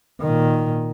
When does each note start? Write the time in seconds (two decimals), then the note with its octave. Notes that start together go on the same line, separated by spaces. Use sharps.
0.20 A#2 D#3